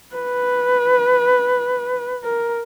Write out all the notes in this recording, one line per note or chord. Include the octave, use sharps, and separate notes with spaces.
B4
A#4